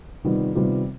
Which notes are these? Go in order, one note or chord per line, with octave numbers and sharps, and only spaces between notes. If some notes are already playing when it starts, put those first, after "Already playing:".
C3 D#3 G3 B3 F4
C3 D#3 G3 B3 F4